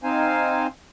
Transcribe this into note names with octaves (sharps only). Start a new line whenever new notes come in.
C4 D#4 C5 F5 G#5